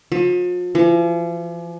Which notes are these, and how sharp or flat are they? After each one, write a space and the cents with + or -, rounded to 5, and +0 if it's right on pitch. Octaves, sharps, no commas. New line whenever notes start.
F3 +40
F3 -45